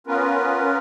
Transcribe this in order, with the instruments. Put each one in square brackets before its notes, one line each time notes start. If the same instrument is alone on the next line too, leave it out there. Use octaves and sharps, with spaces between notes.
[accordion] B3 C#4 F4 A#4 B4